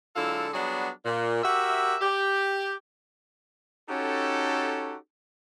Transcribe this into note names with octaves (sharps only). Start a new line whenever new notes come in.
D3 F#3 G#3 E4 F4 A4
F#3 G3 B3 D4 F#4 G#4
A#2
F#4 G4 A#4 E5
G4
C#4 D#4 F#4 G4 A4